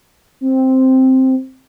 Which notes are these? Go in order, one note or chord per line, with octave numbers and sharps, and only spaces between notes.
C4